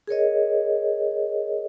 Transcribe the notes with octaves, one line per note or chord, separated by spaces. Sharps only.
G#4 A#4 C#5 D#5